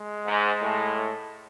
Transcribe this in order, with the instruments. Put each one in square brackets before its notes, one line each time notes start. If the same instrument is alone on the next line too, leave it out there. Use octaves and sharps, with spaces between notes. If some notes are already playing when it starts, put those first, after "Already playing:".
Already playing: [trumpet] G#3
[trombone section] G#2
A2